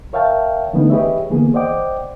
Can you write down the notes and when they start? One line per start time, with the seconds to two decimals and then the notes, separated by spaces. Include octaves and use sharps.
0.13 A#4 C#5 E5 F5 G5 A5
0.73 D3 E3 A3 B3 D4 D#4
0.90 G4 G#4 B4 C#5 D#5 E5
1.30 D3 E3 A#3 B3 G#4
1.54 C5 D5 D#5 F#5 G5 D6